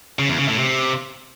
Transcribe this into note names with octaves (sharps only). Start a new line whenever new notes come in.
C#3
E2
C#3
A2
C3